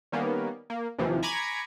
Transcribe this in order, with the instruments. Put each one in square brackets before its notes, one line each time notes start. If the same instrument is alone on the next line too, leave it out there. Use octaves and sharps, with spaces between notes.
[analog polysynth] D#3 G3 A#3 B3 C#4
A#3
D#2 C3 E3 F3
G#5 A#5 B5 C#6 D6 G#6